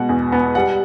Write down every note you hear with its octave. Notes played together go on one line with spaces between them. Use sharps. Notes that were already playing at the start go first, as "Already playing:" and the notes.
Already playing: B2 G#3 F#5
E2
B3
G3 F#5